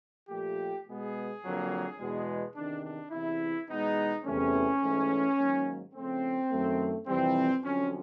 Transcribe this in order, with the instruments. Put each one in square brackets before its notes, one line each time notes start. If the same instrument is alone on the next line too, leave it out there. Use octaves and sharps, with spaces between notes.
[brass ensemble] A#2 F3 A3 G4
B2 G#3 B3 G#4
F2 D3 F#3 A#3
E2 B2 G#3 B3
E2 C3 D#3 D4
D4
E2 C3 E3 E4
E2 B2 G#3 B3 D#4
E2 C3 E3 A3 C#4
G#2 E3 A3
G#2 D#3 F#3 A#3
C#3 F3 A3 C4
F#2 D#3 F#3 A3
F2 C3 E3 G3 C4
F2 D3 F#3 C#4